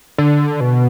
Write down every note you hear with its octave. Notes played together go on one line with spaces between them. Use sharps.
D3
B2